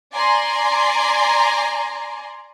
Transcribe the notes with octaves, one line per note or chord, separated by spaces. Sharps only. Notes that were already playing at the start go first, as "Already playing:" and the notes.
D5 G#5 A#5 C6